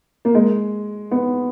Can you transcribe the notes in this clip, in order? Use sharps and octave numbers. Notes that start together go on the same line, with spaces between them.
A#3
G#3
B3